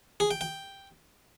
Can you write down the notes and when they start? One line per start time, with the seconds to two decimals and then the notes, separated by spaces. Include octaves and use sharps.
0.20 G#4
0.31 G5
0.41 G5